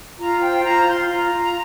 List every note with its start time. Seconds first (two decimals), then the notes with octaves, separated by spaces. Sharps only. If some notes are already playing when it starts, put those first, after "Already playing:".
0.18 F4 A#5
0.40 C5 G5
0.63 F4 A#5
0.86 F4 C6
1.08 F4 A#5
1.31 F4